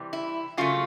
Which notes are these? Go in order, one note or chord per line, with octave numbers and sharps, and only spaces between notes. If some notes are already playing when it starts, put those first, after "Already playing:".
Already playing: C3 E3 G3
E4
C#3 F#3 A3 F4